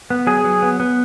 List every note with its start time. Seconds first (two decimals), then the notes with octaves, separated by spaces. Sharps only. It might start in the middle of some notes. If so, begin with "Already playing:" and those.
0.10 B3
0.27 F#3 G#4
0.44 F#3
0.62 B3
0.80 B3